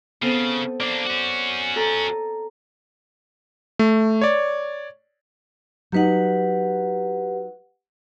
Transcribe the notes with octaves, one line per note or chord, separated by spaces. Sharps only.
C#3 B3 C4 A4
A#3 D4 D5
C#4 F#4
A4 A#5
A3
C#5 D5
F#3 D#4 G4 B4 F#5